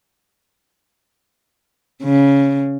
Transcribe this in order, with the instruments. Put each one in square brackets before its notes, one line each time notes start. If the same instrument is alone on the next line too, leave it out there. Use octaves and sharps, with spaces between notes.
[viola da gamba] C#3